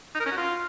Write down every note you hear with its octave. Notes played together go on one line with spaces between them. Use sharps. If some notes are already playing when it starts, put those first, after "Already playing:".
D#4
A#4
C#4
F#4
F4